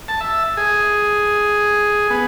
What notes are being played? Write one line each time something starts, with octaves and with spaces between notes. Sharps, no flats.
A5
E5
G#4
B3